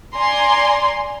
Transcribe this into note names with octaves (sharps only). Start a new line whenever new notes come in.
D5 G#5 A#5 C6